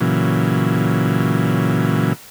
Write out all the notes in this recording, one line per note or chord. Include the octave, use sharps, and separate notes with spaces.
A#2 C#3 E3 F#3